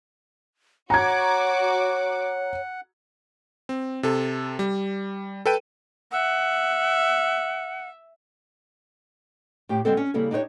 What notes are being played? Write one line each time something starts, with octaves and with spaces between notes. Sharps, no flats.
F#4 C#5 F#5 A#5 D6 G#6
C4
C3 A4
G3
A4 B4 G5 D#7
E5 F#5
A2 G4 G5
D3 G3 G#3 C4 A4
C#4
C#3 G3 A#3 E4 A4
D4 D#4 G4 C5 C#5